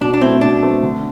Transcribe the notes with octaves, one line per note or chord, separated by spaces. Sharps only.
B2 D4
D4
A3 C4 E4
B2 D4
A3 C4
D3